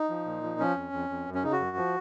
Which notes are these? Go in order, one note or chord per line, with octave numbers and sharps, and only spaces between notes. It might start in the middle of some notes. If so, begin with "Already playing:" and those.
Already playing: D#4
F3
A#2
F3
F3 C#4
F2
F2
F2
F#2
C#4
C#3 D#4
F#4
F#2
F3